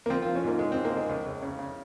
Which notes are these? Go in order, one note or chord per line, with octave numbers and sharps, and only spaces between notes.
A#3
F3 C4
F4
F3
C#4
G#2 A#3
G#2 G#3
C4
G#2
A#3
G#2 G#3
C#2
C#2
C#3
C#3